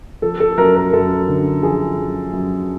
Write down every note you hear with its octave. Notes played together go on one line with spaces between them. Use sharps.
F3 A4
A4
F#2 A#4
A#4
F#2 A4
D3
F3 G#4
F#2
F#2